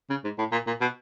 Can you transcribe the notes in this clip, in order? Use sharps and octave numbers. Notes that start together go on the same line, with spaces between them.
C#3
G#2
A2
A#2
A#2
B2